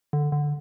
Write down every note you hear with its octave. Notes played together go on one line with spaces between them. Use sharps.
D3
D3